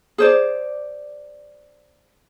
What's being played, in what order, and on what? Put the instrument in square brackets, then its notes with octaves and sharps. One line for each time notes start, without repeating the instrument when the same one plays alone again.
[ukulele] G#4 C5 D5